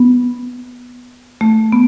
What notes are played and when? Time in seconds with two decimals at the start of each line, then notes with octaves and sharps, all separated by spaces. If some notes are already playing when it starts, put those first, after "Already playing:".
Already playing: B3
1.41 A3
1.72 B3